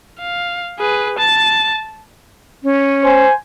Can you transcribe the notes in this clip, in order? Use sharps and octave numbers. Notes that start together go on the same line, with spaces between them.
F5
G#4 B4
A5 A6
C#4
C5 G#5